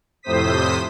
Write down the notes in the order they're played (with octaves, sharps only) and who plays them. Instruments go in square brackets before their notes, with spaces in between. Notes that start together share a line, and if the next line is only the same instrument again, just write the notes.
[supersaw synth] F2 A2 C3 C5 D#6 B6